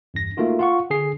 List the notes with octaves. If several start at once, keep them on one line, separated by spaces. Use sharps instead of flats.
E2 G2 A#6
A3 A#3 D#4 F4 F#4
F4 F#5 C#6
D3 G#4 C7